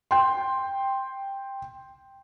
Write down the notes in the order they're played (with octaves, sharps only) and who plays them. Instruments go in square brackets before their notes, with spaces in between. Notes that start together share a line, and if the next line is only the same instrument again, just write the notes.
[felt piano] G5 C6